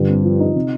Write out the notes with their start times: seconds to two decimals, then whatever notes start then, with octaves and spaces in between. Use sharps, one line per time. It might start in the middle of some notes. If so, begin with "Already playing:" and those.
Already playing: G2 D3 F4
0.09 C4
0.24 F3
0.40 D#4
0.56 C3